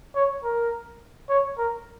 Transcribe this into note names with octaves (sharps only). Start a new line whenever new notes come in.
C#5
A#4
C#5
A#4